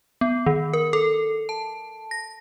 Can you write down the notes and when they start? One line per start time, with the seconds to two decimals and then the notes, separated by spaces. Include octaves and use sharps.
0.21 B3
0.46 D#3
0.73 A#4
0.93 A4
1.49 A5
2.11 A#6